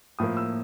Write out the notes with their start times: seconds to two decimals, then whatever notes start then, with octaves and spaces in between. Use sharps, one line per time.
0.19 A2 F3 A#3 D#6
0.37 E6